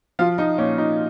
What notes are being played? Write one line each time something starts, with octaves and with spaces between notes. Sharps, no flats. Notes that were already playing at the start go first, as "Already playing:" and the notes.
F3 F4
F3 D#4
A#2 C#4
A#2 D#4